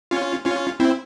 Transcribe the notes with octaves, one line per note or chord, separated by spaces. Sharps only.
C#4 F4
C#4 F4
C4 E4